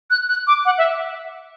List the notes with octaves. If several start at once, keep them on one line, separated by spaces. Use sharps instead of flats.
F#6
F#6
D6
F#5
E5